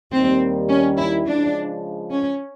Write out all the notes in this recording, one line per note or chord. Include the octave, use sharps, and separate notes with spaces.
D#2 D#3 G3 A#3 C4
C#4
E4
C#3 F3 G#3 D4
C#4